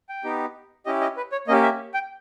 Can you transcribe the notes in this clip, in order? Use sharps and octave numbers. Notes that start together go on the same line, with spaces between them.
G5
B3 D#4 G4
C#4 E4 G4 D#5
D#5
B4
C#5
A#3 C#4 G4 D#5
E5
G5